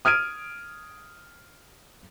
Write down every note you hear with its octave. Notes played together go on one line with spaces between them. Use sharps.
D#6 F6 G#6 D7 D#7